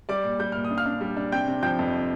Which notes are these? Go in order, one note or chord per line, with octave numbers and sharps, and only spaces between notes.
G3 D5 D6
A#2
G3 G6
A#2 F6
D#6
D4
F5 F6
D4
G3
D4
C3 G5 G6
C3
F3 G5 G6
F2